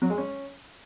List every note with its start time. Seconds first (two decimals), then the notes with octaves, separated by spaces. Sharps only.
0.02 F#3
0.10 G#3
0.18 C#4